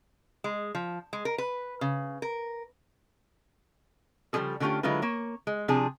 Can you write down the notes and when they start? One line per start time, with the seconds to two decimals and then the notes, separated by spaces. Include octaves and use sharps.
0.44 G#3
0.75 F3
1.13 G#3
1.25 A#4
1.38 B4
1.81 C#3
2.22 A#4
4.33 C#3 F3 G3 F4 G#4 A4
4.60 D3 G3 A3 C#4 F4 G4
4.83 D3 F#3 G#3 E4 F4 B4
5.02 A#3 C#5
5.47 G#3
5.68 C3 F3 D4 G#4